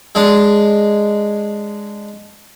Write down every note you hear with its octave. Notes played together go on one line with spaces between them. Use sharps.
G#3 D4